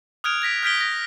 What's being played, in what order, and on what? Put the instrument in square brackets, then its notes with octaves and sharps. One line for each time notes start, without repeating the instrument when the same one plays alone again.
[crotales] D#6 F6 F#6 G#6 D7 F7
G#6 A#6 B6 D7
F6 G6 G#6 B6 D7 G7
A#6